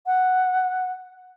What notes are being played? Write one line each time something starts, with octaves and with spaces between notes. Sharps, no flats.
F#5